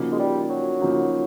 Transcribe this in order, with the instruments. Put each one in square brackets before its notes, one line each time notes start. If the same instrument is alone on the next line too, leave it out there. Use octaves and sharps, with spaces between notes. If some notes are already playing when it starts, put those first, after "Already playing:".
Already playing: [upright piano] C#3 F3 A#3 D#4 F#4
[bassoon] G#3
G3
F#3
[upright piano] C#3 F3 A#3 D#4 F#4